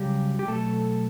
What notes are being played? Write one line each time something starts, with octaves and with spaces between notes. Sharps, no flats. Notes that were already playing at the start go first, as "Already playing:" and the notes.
Already playing: C#3 F#3 G3 G4
G4
B2 F#3 A3 A4